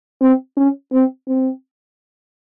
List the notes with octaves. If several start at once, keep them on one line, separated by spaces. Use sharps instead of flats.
C4
C#4
C4
C4